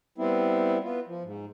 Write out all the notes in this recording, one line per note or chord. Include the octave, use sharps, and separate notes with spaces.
G3 B3 C4 E4
B3 F4
F3
G#2